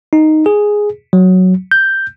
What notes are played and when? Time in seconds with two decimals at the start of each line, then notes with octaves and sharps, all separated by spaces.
0.13 D#4
0.46 G#4
1.13 F#3
1.71 G6